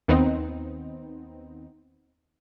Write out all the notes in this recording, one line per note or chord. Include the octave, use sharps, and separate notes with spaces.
D#2 B3 C4 D#4